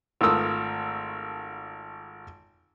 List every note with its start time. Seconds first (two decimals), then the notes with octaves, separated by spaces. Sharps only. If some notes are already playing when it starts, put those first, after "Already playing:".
0.21 G#1 A3 F4 A#4 D#6 E6